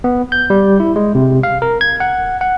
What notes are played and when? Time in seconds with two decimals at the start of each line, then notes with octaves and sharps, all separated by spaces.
0.04 B3
0.32 G6
0.50 G3
0.80 E4
0.96 G#3
1.15 C3
1.43 F5
1.62 A#4
1.81 G#6
2.00 F#5
2.41 F#5